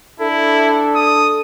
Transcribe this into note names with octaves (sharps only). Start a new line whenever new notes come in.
D4 E4 A4
D#6